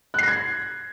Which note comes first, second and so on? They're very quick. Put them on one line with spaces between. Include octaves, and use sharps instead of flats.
F#6 C7 A#6 G#6